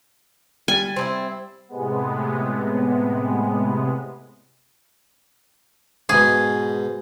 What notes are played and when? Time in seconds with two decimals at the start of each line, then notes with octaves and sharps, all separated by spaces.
0.68 G3 G#5 A6
0.96 C4 D4 E4
1.69 A2 C3 G#3 B3
6.09 G#2 B2 G#4